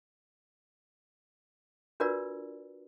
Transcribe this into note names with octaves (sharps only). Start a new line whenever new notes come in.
D4 F4 F#4 A#4 B4 D5